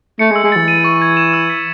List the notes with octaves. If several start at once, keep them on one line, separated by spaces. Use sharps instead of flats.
A3 C#7
G#3
E6
G#3
E3 A6
D#7
C#6
G#6
E7
E6
B6